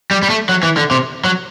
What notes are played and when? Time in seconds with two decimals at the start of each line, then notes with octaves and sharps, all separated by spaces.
0.11 G3
0.23 G3
0.30 A3
0.49 F#3
0.63 E3
0.77 D3
0.91 C3
1.25 F#3